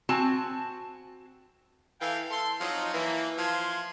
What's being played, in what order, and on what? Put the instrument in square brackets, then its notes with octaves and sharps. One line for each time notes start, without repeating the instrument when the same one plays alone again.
[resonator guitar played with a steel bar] C4 F#4 G#5 A5
[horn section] E3 A4 F5 G5
A4 C6
F3 F#3 D#4
E3 A#3
F3 G#5 C6